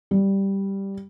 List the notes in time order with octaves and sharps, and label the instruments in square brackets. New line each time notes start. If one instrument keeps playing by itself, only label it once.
[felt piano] G3